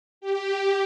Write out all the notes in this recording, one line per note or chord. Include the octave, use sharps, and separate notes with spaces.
G4